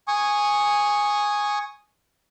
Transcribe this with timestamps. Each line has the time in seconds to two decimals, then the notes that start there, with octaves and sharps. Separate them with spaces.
0.08 G#5 C#6 D#6